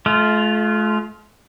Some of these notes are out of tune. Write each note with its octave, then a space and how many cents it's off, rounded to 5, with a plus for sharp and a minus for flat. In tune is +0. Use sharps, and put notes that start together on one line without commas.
A3 -40 F4 +0